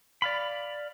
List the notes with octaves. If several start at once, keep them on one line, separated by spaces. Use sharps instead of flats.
D5 F5 B5